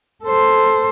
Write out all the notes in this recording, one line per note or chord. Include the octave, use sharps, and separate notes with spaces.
A4 C5